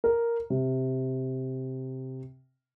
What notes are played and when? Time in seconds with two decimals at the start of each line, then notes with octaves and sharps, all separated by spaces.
0.04 A#4
0.50 C3